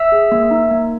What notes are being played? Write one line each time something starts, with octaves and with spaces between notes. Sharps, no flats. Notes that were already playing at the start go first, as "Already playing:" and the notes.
Already playing: E5 E6
G#4
A#3
D#4
A#3